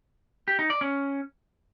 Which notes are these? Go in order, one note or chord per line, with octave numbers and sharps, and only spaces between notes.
G4
D#4
D5
C#4